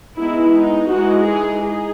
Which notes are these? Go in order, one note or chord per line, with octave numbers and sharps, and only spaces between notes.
G#3 B3 D#4 E4
D#4
E3 G#3 D#4 F#4
G#4
D#4 G#4